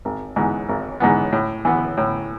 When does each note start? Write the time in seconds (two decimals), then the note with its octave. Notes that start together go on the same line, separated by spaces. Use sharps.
0.05 G#1
0.36 G#2 E3 B3
0.69 G#1
1.00 G#2 E3 B3
1.33 A2
1.65 E3 B3
1.97 A2